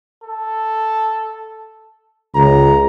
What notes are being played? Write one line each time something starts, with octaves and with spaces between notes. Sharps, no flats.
A4
C#2 A#5